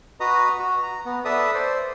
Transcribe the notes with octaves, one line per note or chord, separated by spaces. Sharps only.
F#4 B4 D#5 A#5 D#6
F#4
A#5
B3
A4 B4 D5 E5 D#6
C5 D5